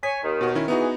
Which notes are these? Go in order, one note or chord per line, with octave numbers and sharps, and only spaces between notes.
C#5 G#5 B6
D#2 D#3
B2 F#4
D#3 C#4 E4
E3 B3 D#4 F#4 G#4